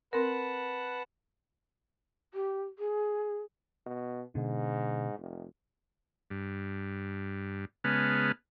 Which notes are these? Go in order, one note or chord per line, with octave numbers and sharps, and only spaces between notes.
C4 A#4 B4 F#5 A5
G4
G#4
B2
G#2 B2 D3
F1
G2
C#3 G#3 B3 B4 A5 F6